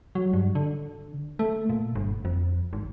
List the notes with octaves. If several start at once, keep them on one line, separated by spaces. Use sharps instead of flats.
F#3
G2
D3
A3
A#2
G1
F2
G#1